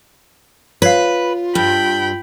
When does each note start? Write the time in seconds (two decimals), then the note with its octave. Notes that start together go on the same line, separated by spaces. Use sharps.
0.82 F4 B4 C#5 F5
1.55 G2 G5 B5